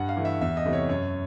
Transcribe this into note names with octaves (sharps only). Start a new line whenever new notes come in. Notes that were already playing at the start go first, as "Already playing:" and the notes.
Already playing: G2 F#5
F5
E3 A3
E5
E2 E5
D#5
C3 E3 A3
C#5
F#2 C#5